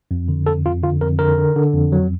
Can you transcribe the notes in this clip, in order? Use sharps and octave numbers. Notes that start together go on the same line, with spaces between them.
F2
D3
F2 A4
F2 F4
D3 F4
F2 A#4
D3 A#4
D3
D3
F2
F#3